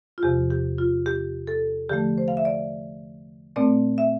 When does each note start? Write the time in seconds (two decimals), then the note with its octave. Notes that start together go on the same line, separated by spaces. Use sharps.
0.18 F4
0.23 E2 C3 F3 G4
0.50 G4
0.78 F4
1.06 G4
1.47 A4
1.89 D3 F3 A3 G4
2.18 C5
2.28 F5
2.37 E5
2.45 D5
3.56 A#2 A3 C4 D5
3.98 E5